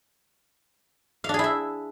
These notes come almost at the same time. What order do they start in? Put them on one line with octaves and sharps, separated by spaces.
F5 D4 G#4 E4 E5